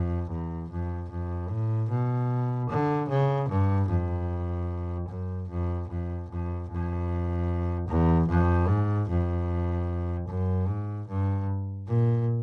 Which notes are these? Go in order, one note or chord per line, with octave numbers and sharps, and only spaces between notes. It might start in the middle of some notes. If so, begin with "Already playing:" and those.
Already playing: F2
E2
F2
F2
A2
B2
D3
C#3
G2
F2
F#2
F2
F2
F2
F2
E2
F2
G#2
F2
F#2
G#2
G2
A#2